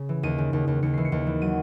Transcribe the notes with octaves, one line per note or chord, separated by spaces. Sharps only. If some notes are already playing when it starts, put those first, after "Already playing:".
Already playing: C#3
E3
D#2 D#7
C#3
D#2
D#2
D#2 C#7
E3 C7
C#7
D#2
E3
F#3 D#7